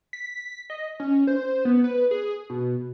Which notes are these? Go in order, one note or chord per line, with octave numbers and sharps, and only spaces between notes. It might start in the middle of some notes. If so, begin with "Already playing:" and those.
B6
D#5
C#4
C5
B3
B4
G#4
B2